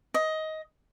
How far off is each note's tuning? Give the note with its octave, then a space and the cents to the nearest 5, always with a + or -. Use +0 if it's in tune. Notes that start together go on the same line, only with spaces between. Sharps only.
D#5 +15